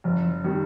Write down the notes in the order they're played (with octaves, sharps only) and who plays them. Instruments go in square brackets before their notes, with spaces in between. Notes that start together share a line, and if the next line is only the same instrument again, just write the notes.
[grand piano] F#1 [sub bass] F3
[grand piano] D#3 G3